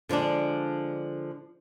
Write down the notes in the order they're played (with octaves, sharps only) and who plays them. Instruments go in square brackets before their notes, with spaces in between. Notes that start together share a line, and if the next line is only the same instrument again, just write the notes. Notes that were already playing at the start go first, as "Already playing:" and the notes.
[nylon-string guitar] D3 F3 G#3 D4